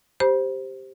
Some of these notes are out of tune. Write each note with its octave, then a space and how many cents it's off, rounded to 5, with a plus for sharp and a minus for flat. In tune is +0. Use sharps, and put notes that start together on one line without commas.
G4 +0 C5 +0 B5 -40